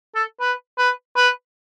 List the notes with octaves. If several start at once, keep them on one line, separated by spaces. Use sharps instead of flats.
A4
B4
B4
B4